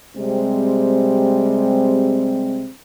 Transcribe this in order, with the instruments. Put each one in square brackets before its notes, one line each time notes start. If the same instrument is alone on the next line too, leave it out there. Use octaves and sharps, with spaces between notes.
[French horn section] C3 G3 G#3 C4